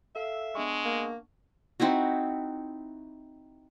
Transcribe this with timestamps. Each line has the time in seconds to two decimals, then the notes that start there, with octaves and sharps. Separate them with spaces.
0.16 A4 E5 F5
0.55 G#3 B3 D4 C#6
0.85 A#3
1.80 C4 D#4 E4 F#4